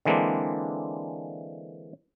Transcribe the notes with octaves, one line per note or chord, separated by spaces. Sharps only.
D3 E3 G#3 A#3 C4 D4